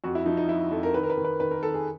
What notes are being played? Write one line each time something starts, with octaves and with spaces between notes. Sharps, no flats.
F2 F#4
E4
F3 D#4
D#4
F3 E4
F2 A4
A#4
D#3 B4
A#4
B4
D#3
B4
D#3 B4
A#4
D#3 A4
G#4